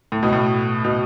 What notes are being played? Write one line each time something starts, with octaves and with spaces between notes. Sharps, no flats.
A2
B2
A2
B2